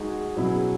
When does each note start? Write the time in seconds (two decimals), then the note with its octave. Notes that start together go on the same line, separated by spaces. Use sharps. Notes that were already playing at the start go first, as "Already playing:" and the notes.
Already playing: G#3 D#4 F#4
0.37 B2 F#3 C#4 E4 G#4